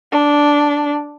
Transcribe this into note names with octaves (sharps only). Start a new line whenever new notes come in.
D4